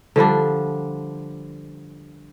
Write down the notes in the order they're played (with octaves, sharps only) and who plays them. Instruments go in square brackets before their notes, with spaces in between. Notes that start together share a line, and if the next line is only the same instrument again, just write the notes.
[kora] D3 F3 G3 D4